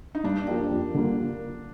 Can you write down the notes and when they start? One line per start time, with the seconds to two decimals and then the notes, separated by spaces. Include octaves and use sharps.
0.15 D#4
0.24 G2 D4
0.48 F3 A#3 D4 G4
0.71 F2
0.94 D3 G3 A#3 F4